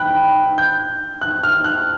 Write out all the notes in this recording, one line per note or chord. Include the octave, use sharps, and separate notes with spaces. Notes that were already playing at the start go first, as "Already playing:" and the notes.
Already playing: G5 B5 F#6
G6
F#6
F6
F#6